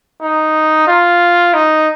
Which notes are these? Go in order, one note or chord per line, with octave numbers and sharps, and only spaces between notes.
D#4
F4
D#4